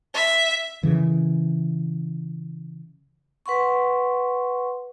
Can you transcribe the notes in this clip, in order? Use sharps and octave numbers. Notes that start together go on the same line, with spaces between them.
E5
C#3 E3
B4 F#5 C6 C#6